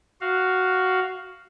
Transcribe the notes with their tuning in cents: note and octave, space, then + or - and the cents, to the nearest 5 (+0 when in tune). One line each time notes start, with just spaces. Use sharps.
F#4 +5 F5 +0